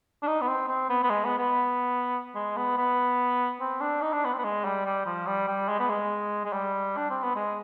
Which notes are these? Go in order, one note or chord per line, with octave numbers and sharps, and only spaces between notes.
D4
D#4
B3
C4
C4
B3
B3
G#3
B3
B3
G#3
B3
B3
C4
D4
D#4
D4
B3
C4
B3
G#3
G3
G3
F3
G3
G3
G#3
B3
G#3
G#3
G3
D4
C4
B3
G#3